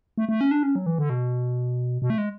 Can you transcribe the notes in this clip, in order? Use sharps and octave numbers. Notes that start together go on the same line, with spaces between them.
A3
A3
C#4
D4
C#4
F#3
E3
D3
B2
B2
A3
G#3